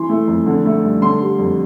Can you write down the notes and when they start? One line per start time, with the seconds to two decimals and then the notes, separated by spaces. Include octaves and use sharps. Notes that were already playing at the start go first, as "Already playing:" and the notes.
Already playing: E3 C6
0.09 A3
0.28 F2
0.46 D3
0.65 A3
0.84 G2
1.02 D3 C6
1.21 G3
1.39 F2